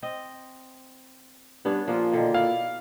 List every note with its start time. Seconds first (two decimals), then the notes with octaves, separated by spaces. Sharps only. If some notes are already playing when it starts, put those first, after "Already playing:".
0.03 C4 D#5
1.65 G2 B3 C#4 D4
1.88 A#2 F3 A#3 F4
2.12 B2 D3 D#3
2.34 E4 D5 F5